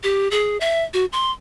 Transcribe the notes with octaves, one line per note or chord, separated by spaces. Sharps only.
G4
G#4
E5
F#4
C6